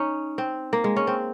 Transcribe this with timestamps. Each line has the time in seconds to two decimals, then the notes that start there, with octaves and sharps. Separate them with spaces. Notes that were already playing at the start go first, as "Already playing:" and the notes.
Already playing: C#4 D#4
0.38 C4
0.73 A#3
0.84 G#3
0.96 C#4
1.07 C4